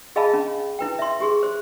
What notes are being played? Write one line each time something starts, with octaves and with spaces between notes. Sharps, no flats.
G#4 D#5 F5 G#5 A5 B5
C#4
E4 B4 G5
E5 C6
G4 G#4 C6
C5